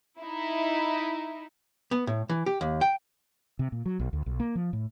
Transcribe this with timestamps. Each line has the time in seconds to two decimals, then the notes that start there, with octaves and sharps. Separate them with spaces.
0.20 D#4 E4
1.91 B3
2.07 A2
2.29 E3
2.46 G4
2.61 D#2
2.81 G5
3.59 C3
3.72 A#2
3.86 F#3
4.00 B1
4.13 D2
4.26 B1
4.40 A#3
4.55 F3
4.73 A2